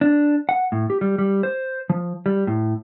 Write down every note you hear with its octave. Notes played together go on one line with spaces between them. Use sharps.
D4
F#5
A2
G4
G3
G3
C5
F3
G3
A2